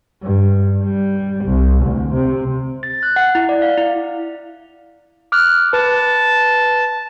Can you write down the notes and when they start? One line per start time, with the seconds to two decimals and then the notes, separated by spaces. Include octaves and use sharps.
0.23 G2
0.84 G3
1.45 C2
1.84 D2
2.13 C3
2.83 A6
3.03 F#6
3.16 F#5
3.35 E4
3.49 D5
3.62 F5
3.78 E4
5.32 D6 F6 F#6
5.73 B4 A5